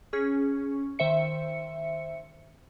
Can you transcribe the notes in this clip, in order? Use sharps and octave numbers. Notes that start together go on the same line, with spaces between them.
C#4 G#4 C#6
D#3 C5 E5 C#7